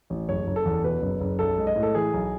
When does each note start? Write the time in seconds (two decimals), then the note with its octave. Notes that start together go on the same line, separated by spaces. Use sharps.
0.10 A1
0.29 F#1 C#5
0.47 F#1
0.56 A4
0.65 E2
0.84 B2 B4
1.02 F#1
1.21 F#1
1.39 B1 A4
1.58 G#3
1.67 D#5
1.76 A2
1.83 A4
1.95 E3 G#4
2.14 B1